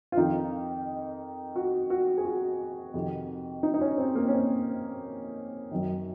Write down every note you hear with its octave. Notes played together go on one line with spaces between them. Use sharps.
F4
F2 D#3 D#4
F#4
F#4
G#4
F#4
F2 C3 D#3
D#4
D#4
C#4
C4
A#3
C#4
C4
F#2 D#3